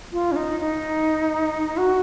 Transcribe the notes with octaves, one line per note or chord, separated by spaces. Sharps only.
F4
C#4
D#4
D#4
F#4